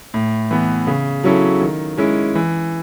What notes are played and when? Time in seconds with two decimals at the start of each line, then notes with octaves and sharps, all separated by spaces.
0.14 A2
0.51 E3 B3
0.87 C#3
1.24 F#3 C#4 E4 A4
1.62 D#3
1.97 G#3 C#4 E4
2.35 E3